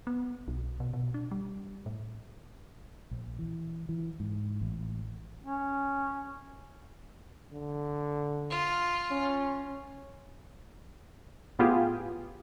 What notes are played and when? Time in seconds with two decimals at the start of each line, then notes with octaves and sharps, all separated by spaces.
0.07 B3
0.48 B1
0.80 B2
0.93 B2
1.14 D4
1.31 G3
1.86 A2
3.11 A#1
3.39 E3
3.89 E3
4.20 G#2
4.61 A1
5.43 C#4
7.53 D3
8.50 F4
9.11 C#4
11.59 A2 B3 F4 G4 G#4